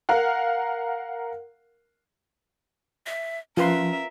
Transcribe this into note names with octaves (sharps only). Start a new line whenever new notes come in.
A#4 F5 F#5
E5
F3 C#4 F4 A#4 B4 E5 C6